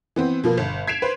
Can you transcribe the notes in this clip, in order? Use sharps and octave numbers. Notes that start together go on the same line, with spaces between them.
E3 B3 C4
B2 F3 A#3
G1
G#6 B6 C7 D7 E7 F7
B4 C5